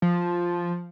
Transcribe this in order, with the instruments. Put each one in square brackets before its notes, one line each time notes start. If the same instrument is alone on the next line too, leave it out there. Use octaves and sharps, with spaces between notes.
[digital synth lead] F3